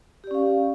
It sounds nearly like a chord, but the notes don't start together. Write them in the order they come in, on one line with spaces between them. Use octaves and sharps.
G4 D5 C#4 F5